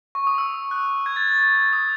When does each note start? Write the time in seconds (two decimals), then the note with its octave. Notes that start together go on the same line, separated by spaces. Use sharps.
0.15 C#6
0.27 D#6
0.38 E6
0.71 F#6
1.06 G#6
1.16 A6
1.28 A6
1.40 A6
1.55 A6
1.73 D#6